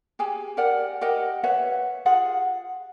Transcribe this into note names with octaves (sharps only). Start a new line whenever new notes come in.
G4 G#4 G#5
G4 A#4 D5 F#5
G4 A#4 D#5 F#5
B4 C#5 E5 F#5
F4 G4 G#4 F#5